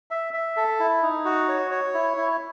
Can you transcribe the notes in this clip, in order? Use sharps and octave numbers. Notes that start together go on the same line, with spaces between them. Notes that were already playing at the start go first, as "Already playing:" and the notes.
E5
E5
A4
E4
D#4
F#4
C#5
C#5
E4
E4